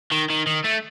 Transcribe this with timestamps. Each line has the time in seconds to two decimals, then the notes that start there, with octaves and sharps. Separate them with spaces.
0.11 D#3
0.30 D#3
0.47 D#3
0.65 A3